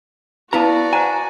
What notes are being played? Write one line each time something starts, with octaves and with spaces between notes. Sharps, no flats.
B3 E4 F#4 B4 D5 F5 A5 A#5
C5 F#5 G#5 A#5